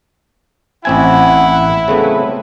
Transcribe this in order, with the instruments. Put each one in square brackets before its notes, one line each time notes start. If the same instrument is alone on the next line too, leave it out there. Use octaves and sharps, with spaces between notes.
[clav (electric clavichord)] A1 C4 G#5 [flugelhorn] E4 [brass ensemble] F#5
[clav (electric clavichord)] C#3 A3 B3 [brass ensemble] F#3 C4 B4